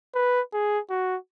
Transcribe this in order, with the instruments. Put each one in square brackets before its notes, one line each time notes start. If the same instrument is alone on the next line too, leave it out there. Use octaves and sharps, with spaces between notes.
[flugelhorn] B4
G#4
F#4